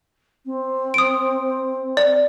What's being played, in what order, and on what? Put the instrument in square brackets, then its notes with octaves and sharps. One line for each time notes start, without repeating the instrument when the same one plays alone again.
[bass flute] C4
[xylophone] D#6 D7
D5